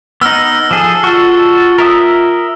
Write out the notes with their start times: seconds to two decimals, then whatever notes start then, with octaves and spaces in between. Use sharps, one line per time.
0.21 B3 D#4 E6 F6
0.71 F3 G#4 A4
1.04 F4 F#4 A4
1.78 A#4 E5 D#6